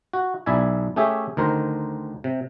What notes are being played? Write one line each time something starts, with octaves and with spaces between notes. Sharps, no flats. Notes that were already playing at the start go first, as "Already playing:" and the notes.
F#4
B1 E4 D5 E5 G#5
A3 C#4 G4 G#4 E5
D2 D#3 A#4 C5
C3